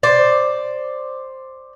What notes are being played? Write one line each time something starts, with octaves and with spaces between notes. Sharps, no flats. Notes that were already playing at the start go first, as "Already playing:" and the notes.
C5 D5